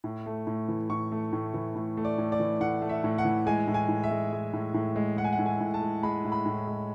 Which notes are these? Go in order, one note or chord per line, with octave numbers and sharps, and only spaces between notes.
A2
A3
A2
E3
A2 C#6
A3
A2
E3
A2
A3
D5
A2
D5
E3
A2 F#5
A3
E5
A2
F#5
E3
G#3 G#5
A2
G#5
A2
E5
G#3
G#3
A2
A2
G#3
G#3 F#5
G#5
F#5
A2
G#5
A2
A5
G#3
G#3 B5
A2
B5
A2
G#3